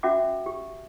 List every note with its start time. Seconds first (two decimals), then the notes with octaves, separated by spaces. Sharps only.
0.03 C#4 F#4 E5 F#5 D6
0.46 G4